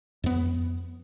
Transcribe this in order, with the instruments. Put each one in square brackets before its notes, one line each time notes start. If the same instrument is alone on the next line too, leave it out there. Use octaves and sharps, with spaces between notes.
[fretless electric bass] F2 B3